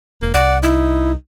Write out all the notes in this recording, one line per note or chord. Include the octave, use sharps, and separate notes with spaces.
E1 A#3
C2 D5 F#5
D#4 E4